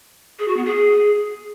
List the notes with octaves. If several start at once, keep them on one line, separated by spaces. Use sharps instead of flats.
G#4
F#4
B3
G#4